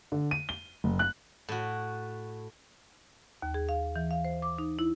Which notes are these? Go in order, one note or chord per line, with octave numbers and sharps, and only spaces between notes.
D3
D#7
G7
F#1
F#6
A2 F#4
D#2
G#4
F5
E3
F5
C5
D6
D#4
E4